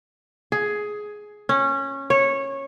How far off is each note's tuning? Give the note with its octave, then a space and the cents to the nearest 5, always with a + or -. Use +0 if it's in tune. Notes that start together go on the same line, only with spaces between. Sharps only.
G#4 +10
C#4 -15
C#5 -15